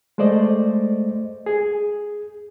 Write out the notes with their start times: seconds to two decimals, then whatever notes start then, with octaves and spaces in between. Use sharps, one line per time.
0.18 G#3 A3 C5 D5 D#5
1.46 G#4